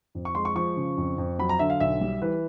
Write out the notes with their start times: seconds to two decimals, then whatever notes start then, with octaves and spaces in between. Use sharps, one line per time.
0.15 F2
0.25 C#6
0.35 G#3 C6
0.45 C#6
0.55 F3 C#6
0.76 C#3
0.97 F2
1.18 F2
1.39 F#3 B5
1.49 A#5
1.59 D3 E5
1.70 F5
1.80 B1 E5
2.01 G3
2.22 E3 B4